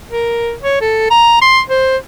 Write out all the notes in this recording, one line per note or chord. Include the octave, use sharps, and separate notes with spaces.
A#4
C#5
A4
A#5
C6
C5